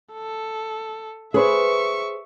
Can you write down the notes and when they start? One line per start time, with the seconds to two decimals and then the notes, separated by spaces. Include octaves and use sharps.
0.13 A4
1.34 G#4 B4 C5 E5 C#6